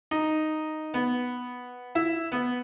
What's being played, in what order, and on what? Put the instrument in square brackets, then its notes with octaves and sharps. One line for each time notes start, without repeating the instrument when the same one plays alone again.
[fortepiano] D#4
B3
E4
B3